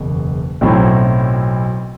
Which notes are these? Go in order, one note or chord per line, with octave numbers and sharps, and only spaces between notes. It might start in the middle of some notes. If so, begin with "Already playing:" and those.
Already playing: F#1 E2 B2
B1 A2 F#3 C4 E4